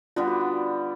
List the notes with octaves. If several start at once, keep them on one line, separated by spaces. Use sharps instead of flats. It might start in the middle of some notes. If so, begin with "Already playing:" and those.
D3 G3 B3 D4 F4
F#4
F4